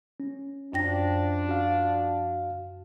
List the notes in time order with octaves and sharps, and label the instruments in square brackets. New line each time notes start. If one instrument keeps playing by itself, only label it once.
[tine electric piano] C#4
[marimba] F#2 G5 A#6 [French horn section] F3 D4
[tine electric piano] F#4 F5